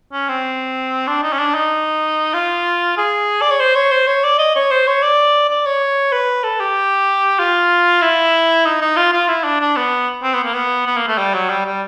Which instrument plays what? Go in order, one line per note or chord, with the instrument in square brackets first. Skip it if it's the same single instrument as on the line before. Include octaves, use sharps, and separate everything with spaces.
[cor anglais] C#4
C4
D4
D#4
C#4
D4
D#4
F4
G#4
D5
C#5
C5
C#5
C5
C#5
D5
D#5
C#5
C5
C#5
D5
D5
C#5
B4
A4
G4
F4
E4
D#4
D#4
F4
F4
E4
D4
D4
B3
C4
B3
A#3
B3
B3
A#3
A3
G3
F#3
G3
G3